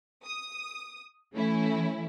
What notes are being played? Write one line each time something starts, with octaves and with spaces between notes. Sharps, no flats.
D#6
E3 A3 C#4 E4